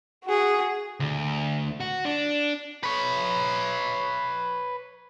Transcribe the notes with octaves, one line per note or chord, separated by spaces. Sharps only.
F#4 G#4
D2
F#4
D4
B4 C#5